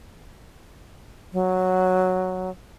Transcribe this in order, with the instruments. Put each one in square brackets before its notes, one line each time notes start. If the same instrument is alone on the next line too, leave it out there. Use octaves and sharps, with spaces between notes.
[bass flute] F#3